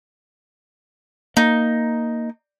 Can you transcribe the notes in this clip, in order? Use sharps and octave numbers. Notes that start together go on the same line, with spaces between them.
A#3 D#4